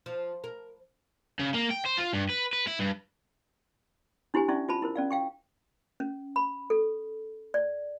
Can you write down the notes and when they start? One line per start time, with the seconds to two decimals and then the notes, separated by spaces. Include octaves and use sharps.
0.06 F3
0.44 A#4
1.40 C#3
1.55 A#3
1.71 G5
1.86 C5
1.98 F4
2.13 G2
2.30 B4
2.53 B4
2.67 E4
2.79 G2
4.34 D4 E4 G4 C5 G#5
4.48 C#4 D4 E4 D5 E5 C#6
4.69 F4 C5 A5 B5
4.82 E4 A#4 C5
4.96 C#4 D5 F5
5.11 F5 G5 C#6
6.00 C#4
6.36 B5
6.70 A4
7.54 D5